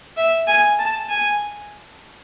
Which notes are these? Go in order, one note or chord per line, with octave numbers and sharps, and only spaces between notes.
E5
G#5
A5
G#5